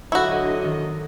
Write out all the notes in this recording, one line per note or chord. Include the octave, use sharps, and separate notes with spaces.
D3 F#3 E4 F#4 D#5 C#6
D#3